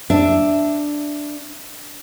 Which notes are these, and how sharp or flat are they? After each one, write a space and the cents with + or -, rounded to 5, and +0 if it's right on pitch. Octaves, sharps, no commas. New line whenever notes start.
D4 +0 E5 +0